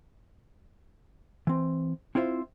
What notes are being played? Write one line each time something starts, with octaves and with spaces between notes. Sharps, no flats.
E3 C4
C4 E4 F4 C5 E5